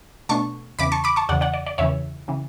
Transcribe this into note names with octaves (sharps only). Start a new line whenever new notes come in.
B2 A3 D4 A5 C#6
E2 C#3 E3 B5 D6
A5 C#6
B5 D6
A5 C#6
E2 C#3 E3 D5 F#5
D5 F#5
D5
D5
E2 C#3 E3 C#5 E5
C#3 E3